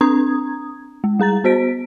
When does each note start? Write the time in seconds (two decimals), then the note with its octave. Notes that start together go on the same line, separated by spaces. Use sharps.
0.01 C4 D4 A#5 D#6 G#6
1.04 G#3
1.19 G3 G#4 A#5 A6
1.44 B3 F#4 C5 B6 D7